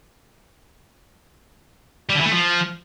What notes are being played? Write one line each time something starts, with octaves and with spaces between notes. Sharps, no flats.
G3
D3
E3
A3
F3